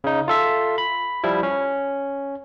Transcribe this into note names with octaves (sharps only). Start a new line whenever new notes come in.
C#3 D#4
F4 A4 E5
B5
F3 G3 E4
C#4